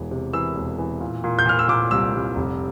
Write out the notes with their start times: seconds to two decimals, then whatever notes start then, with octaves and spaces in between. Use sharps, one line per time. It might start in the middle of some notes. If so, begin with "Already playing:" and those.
Already playing: E1 E3
0.11 C3
0.33 E3 E6
0.56 E1
0.78 E3
1.01 A#2
1.24 A#2
1.39 G6
1.46 A#2 F6
1.59 E6
1.68 A#2 D6
1.91 C2 E6
2.13 C2
2.36 F1